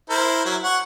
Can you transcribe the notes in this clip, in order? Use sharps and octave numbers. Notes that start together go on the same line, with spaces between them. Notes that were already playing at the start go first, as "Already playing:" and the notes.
E4 A#4 C5
F#3 E4
F#5 C#6